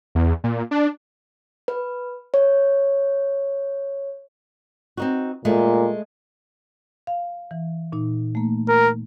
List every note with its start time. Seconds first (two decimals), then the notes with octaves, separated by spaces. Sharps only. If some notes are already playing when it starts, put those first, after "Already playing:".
0.15 E2
0.44 A#2
0.71 D4
1.68 B4
2.34 C#5
4.97 C4 D#4 F#4
5.45 A#2 G#3 A3
7.07 F5
7.51 E3
7.92 A#2 D#4
8.35 A3 A#3
8.69 A#4